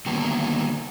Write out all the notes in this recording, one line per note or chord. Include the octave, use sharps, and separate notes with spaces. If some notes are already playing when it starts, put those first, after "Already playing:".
D3 D#3 F#3 G3 A#3 B3